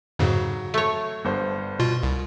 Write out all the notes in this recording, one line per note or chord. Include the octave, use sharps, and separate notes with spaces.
F2 G#2 C#3 F#3
A3 C#5
G1 G2 C5
B2 F4
C2